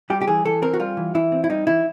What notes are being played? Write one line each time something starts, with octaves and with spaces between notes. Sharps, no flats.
G3 G4
G4
E3 G#4
E3 A4
C4 A#4
F#4
G3 F4
E3
E3 E4
C4
E4
G3 D#4
E3 E4